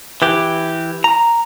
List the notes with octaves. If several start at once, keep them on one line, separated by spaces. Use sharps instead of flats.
E3 G4
A#5